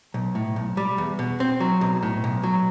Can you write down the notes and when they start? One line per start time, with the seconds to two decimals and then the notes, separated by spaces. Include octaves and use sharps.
0.14 B1
0.35 A2
0.56 B1
0.77 G3
0.98 E2
1.19 B2
1.40 C4
1.60 F#3
1.81 B1
2.03 A2
2.24 B1
2.44 F#3